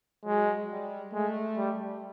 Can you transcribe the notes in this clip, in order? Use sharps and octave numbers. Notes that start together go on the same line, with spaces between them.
F#3 G#3
G3
G#3 A3
G3